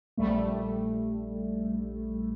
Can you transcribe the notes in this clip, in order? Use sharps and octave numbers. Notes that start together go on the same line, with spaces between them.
A#1 G3 A3